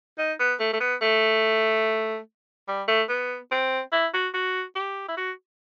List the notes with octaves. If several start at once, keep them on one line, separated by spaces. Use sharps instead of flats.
D#4
B3
A3
A3
B3
A3
G3
A3
B3
C4
E4
F#4
F#4
G4
E4
F#4